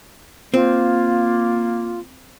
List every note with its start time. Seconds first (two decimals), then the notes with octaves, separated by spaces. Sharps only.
0.54 A#3 C4 F4